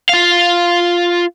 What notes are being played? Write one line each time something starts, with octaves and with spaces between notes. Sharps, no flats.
F4 F5